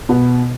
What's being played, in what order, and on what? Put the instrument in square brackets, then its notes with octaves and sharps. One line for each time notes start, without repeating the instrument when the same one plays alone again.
[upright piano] B2 B3